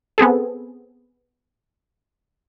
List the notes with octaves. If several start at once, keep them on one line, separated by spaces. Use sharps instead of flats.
B3 C4 G#4 A4